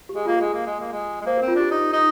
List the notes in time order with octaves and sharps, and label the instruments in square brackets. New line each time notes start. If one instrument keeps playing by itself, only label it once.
[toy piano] G4
[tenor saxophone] G#3 [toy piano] G#4
[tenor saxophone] A#3 [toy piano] F4
[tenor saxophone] G#3 [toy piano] G#4
[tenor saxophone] A#3
G#3
A#3
G#3
G#3
[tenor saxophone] A#3 [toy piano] C5
[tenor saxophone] C4 [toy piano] A#4
[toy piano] F4
[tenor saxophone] D4 [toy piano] G4
[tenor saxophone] D#4
D#4